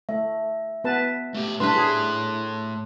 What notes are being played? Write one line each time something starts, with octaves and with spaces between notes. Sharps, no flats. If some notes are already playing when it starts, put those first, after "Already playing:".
A3 E5
B3 B4 A5
A3 G4
A2 G3 D4 B4 E5 A5 C6 F#6
G#4